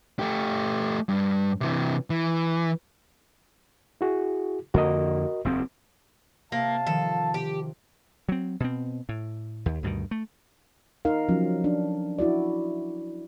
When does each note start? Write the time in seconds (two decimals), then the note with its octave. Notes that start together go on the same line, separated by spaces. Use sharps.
0.19 A3 G4
1.09 G2
1.61 C3 E3
2.10 E3
4.01 E4 F#4 G#4
4.74 F2 D3 A#3 F#4 A#4 D#5
5.45 F#1 E2 C4
6.52 C3 A#3 F5 A5
6.87 D#3 F3 A4
7.34 G4
8.29 F#3 C4
8.60 B2 C4
9.09 A2
9.66 D#2
9.83 D2 G2 B2 D#3
10.11 A3
11.05 D#4 A#4 F5
11.29 F3 F#3 C#4
11.64 D4
12.19 E4 F#4 D5